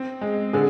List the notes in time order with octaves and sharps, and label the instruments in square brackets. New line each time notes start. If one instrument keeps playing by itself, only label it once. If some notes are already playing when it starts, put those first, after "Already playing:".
Already playing: [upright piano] C4
G#3
[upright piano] D3 [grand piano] G#4